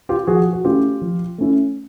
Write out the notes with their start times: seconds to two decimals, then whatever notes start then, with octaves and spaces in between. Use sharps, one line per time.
0.09 F4 G4
0.27 F3 F#4 G#4
0.53 F#4
0.65 A3 C#4 E4 F4 G4
1.02 F3
1.38 A3 C#4 E4